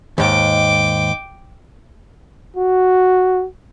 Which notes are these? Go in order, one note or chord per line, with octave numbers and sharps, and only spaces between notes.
D#2 G#2 G5 D6
F#4